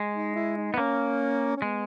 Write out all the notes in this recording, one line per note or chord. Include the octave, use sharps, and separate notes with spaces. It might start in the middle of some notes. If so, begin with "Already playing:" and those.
Already playing: G#3
D#4
E4
D#4
B3
A#3 C#4
C#4
G#3 B3